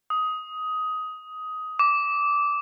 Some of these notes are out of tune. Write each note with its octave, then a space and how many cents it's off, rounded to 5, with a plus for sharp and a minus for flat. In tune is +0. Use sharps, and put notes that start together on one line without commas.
D#6 +15
D6 -15